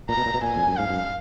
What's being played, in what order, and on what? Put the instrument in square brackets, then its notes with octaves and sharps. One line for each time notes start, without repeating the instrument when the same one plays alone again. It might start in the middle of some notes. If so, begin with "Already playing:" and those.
[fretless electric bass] A#2 [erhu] A#5
[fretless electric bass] B2
A#2
B2
[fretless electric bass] A#2 [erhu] G#5
[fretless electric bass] F2
F#2
[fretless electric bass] G#2 [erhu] F5
[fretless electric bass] F#2